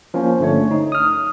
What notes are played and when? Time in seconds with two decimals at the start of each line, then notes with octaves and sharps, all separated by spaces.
0.14 F3 A#3 C#4
0.39 G1 D3 A3 C#5
0.71 D#4
0.92 D#6 F6